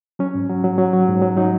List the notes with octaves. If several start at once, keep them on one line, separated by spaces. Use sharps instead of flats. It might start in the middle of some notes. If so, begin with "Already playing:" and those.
F#3 C#4
G#2
F#3
F#3
F#3
F#3
G#2
F#3
F#3 D#4